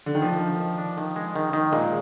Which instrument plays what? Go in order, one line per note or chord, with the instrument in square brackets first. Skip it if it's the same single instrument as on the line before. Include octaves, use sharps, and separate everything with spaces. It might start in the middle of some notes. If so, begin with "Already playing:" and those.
[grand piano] D3
D#3
[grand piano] F3 [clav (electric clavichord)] D4
[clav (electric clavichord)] D#3
D#3
D4
D#3
G#3
D#3
D#3
[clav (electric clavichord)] A#2 [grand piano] G#3